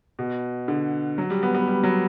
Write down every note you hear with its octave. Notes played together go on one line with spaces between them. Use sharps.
B2
D3
F#3
G3
B3
B3
G3
F#3